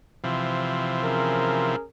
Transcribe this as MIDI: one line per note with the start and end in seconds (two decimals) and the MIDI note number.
0.24 1.76 48
0.24 1.76 52
0.24 1.76 53
1.03 1.84 61
1.03 1.84 68
1.03 1.84 70